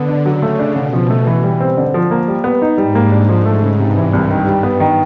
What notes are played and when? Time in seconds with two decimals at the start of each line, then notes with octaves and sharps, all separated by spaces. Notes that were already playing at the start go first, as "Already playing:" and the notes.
Already playing: D3 B3
0.09 D4
0.26 C#3 F#3
0.42 A3
0.59 D4
0.76 B2 D3
0.93 F3
1.10 A3
1.27 E3
1.44 G3
1.60 C4
1.77 D3
1.94 F3
2.11 A#3
2.28 G3
2.44 B3
2.62 D#4
2.78 G#2 G3
2.95 A#3
3.12 D4
3.29 F3
3.45 A3
3.62 C#3
3.79 G2 C3
3.97 E3
4.13 C2
4.29 G2 D#3
4.47 G3
4.63 B3
4.80 D#3